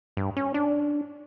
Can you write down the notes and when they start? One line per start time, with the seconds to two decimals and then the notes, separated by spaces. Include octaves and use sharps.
0.17 G2
0.37 C#4
0.54 D4